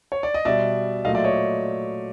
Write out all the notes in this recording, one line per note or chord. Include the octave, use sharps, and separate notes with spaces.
C#5
D5
D#5
B2 G3 D5 E5
A#2 F#3 A3 D#5 F5
D5 E5
C#5 D#5